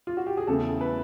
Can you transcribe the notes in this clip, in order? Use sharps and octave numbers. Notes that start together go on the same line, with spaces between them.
F4
F#4
G4
G#4
E2 C#3 E3 A3 A4
B4